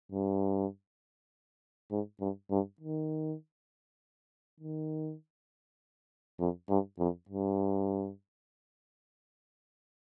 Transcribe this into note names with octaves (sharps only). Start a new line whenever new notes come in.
G2
G#2
G2
G2
D#3
D#3
F2
G2
F2
G2